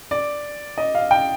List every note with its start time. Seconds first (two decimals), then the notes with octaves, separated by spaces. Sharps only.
0.11 D5
0.78 D#5
0.95 F5
1.11 G5